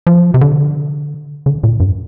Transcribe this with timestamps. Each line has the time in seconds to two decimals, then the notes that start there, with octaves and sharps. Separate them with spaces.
0.07 F3
0.34 C3
0.41 D3
1.46 D3
1.63 A#2
1.80 G2